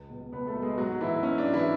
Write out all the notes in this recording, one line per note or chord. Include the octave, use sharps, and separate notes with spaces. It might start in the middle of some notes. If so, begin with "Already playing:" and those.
Already playing: C#2
B2 F#3
C#2 B3 B4
A3 A4
B2 F#3
G#3 G#4
G#2 F#3 F#4
E3 F#3 E4
G#2 C#4
D4
F#3
E3 E4